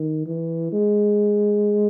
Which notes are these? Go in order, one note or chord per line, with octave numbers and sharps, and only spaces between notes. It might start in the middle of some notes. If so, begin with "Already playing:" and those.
Already playing: D#3
E3
G#3